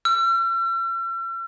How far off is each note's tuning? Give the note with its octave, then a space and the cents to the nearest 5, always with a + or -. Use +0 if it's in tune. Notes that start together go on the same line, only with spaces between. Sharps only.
E6 +45